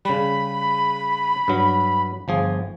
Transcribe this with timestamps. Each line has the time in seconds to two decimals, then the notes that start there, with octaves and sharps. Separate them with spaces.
0.05 C#3 G3 B5
1.48 G2 F#3
2.28 G1 F3 G#4